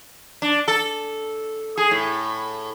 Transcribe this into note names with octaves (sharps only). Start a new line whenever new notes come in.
D4
A4
G#4
A2